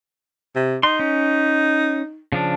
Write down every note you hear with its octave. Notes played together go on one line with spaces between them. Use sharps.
C3
D#4 C6
C#4
C#3 F3 D4